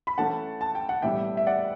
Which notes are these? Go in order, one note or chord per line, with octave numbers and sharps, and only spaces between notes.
B5
E3 A3 C#4 F#5 A5
A5
G5
F#5
A2 E3 G3 B3 E5 G5
E5
D5 F#5